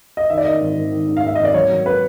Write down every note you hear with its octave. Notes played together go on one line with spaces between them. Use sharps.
D#5
D#3 E5
D5
D#3 D#5
G#1
G#1
D#3
G#2
F5
G#2 E5
G#1 D#5
D5
F#3 C#5
F#3
B4